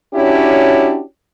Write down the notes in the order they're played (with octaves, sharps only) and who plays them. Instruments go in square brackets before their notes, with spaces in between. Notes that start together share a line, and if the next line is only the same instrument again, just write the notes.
[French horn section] C#4 D4 E4 F#4 G4 C#5